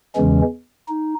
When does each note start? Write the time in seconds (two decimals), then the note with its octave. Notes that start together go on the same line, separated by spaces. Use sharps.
0.15 E2 C#3 E3 G#3 C#4
0.89 D#4